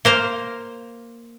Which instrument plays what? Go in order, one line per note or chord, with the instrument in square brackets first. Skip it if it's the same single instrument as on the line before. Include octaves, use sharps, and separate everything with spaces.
[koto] A#3 C5 F5